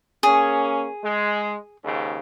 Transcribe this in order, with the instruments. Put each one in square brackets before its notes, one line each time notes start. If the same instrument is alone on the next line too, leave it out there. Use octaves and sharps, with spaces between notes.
[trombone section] A#3 C#4 [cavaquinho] G#4
[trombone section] G#3
D#2 G#2 C#3